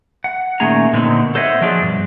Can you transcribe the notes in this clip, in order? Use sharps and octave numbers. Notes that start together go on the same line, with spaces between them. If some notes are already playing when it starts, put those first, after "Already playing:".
F#5
A#2 D#3 A3 C#4 G#4 A#5
A#2 D3 F#3 B3 C4 D#4
A4 C5 C#5 D#5 E5 F#5
F3 F#3 D4 F4 G#4
G2 B2